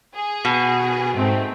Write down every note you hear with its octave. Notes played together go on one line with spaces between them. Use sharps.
G#4
B2
G#2 A3 C4